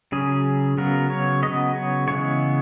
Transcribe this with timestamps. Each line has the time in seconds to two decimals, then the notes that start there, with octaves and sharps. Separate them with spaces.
0.12 C#3 F#3 C#4 G#4
0.78 C#3 F#3 B3 A#4
1.10 C#5
1.43 C#3 F#3 B3 D#5
1.75 C#5
2.08 C#3 E3 G#3 B3 C#5